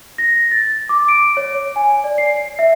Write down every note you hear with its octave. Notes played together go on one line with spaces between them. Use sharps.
A#6
A6
D6
D7
C#5
G#5
D5
C7
E5